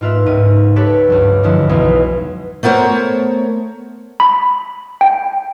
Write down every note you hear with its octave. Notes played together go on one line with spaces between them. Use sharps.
G#2 A#3 F4 B4 E5
C#2 G#2 D#7
G4 A4 B4 C#5
C#2 G2 F#3
F#2 D3 F3 G#3 E4 F#4
B1 E2 B3 E4 G#4
A3 B3 A#4 C5 C#5
B5
G5